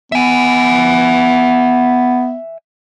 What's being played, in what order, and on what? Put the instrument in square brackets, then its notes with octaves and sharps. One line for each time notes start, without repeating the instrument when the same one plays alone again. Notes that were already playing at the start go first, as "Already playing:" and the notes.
[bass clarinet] B3 [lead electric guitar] E5 G#5